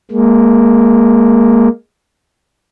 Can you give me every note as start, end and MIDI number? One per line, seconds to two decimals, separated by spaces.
0.11 1.68 56
0.11 1.68 58